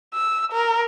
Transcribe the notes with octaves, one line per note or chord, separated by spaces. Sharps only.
E6
A#4